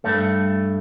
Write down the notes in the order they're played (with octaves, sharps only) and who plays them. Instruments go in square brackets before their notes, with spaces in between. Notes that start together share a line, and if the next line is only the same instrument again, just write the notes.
[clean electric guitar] G2 A3